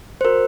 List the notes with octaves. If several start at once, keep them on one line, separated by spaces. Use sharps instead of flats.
C5
F#4 A#4